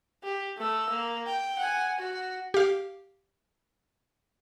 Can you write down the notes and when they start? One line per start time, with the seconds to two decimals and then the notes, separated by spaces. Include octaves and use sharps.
0.24 G4
0.57 A3 E6
0.89 A#3
1.26 G5
1.59 F#5 G#5
1.98 F#4
2.54 G4 F5